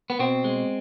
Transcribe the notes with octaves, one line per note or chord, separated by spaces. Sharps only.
B3
B2 C4
G#3